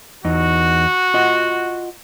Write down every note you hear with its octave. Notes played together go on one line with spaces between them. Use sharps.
E2 D#4 F#4
F4 D#5 F#5